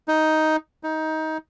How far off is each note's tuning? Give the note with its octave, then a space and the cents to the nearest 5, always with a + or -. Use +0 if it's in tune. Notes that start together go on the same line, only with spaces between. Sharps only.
D#4 +10
D#4 +20